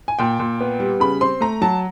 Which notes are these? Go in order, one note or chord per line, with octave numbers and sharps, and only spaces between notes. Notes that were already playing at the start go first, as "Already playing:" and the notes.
G#5
A#2 G5
A#2
B3
G3
C#3 B5
C4 C6
A3 A#5
F#3 A5